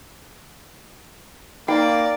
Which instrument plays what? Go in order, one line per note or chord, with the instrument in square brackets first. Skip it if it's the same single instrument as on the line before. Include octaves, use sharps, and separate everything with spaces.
[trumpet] A#3 [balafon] D#4 [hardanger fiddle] D5 [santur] G5